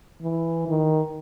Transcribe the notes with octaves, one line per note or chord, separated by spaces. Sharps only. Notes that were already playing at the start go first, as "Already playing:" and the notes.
E3
D#3